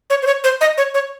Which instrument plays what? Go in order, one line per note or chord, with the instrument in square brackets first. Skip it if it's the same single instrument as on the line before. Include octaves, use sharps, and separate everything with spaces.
[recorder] C#5
C5
C#5
C5
D#5
C#5
C#5